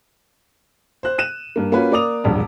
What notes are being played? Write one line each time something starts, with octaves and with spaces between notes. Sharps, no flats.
C5 F#6
F#6 D#7 E7
G2 A#3
A#3 C#4 F4 F#4 B4
A#3 D5 D6 D#6 F7
E1 A#1 G2